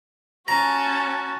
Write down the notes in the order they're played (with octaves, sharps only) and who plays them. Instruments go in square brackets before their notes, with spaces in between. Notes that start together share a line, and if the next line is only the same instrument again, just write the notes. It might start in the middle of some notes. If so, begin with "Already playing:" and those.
[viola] C#4 A5 [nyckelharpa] F#4 [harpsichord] A#5